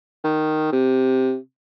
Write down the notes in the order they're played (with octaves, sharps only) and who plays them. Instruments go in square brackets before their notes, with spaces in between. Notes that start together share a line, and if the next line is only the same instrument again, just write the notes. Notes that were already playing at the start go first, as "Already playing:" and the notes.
[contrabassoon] D#3
C3